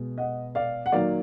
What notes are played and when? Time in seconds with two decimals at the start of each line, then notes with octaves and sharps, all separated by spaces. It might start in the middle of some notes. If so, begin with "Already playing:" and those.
Already playing: B2 G#3
0.18 D#5 F#5
0.55 D5 F5
0.86 F#5
0.92 D#3 F#3 A#3 D5 F5